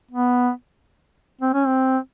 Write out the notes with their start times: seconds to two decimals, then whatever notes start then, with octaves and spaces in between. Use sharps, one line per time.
0.11 B3
1.41 C4
1.54 C#4
1.67 C4